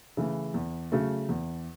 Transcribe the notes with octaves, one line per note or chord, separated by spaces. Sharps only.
C#3 E3 A3
E2
C#3 F#3 A3
E2